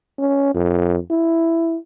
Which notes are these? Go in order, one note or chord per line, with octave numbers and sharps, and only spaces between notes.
C#4
F2
E4